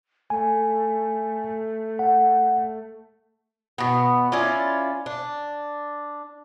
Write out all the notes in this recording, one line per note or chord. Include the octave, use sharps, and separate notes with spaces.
A3 G#5
F#5
B2 B3
C#4 E4 F4 D5
D4